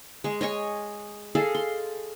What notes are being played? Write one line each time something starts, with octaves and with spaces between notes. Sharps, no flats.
G#3 C#6
C#5 D#5 G#5 C#6
G#4 A4 D#5 F5
C6